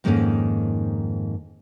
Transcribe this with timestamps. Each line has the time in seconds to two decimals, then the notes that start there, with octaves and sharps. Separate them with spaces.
0.04 F2 G#2 D#3 A3 A#3 C#4